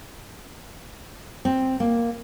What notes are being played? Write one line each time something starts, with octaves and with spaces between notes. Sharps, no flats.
C4
A#3